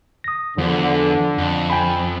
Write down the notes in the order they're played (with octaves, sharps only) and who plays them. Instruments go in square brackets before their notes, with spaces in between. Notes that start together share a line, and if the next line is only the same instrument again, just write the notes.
[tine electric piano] D#6 A#6
[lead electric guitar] E2 [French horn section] D3 [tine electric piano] F3
[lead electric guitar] F2
[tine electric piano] G5 G#5 B5